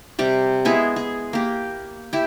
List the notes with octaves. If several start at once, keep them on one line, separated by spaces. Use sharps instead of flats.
C3 G3 G4
G#3 B3 E4 G#4
G#4
A#3 G4
E4 G4